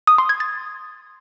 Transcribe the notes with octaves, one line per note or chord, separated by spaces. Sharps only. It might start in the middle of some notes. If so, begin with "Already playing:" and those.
D#6
C6
G#6
A6